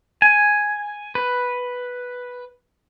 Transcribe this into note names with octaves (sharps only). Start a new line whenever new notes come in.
G#5
B4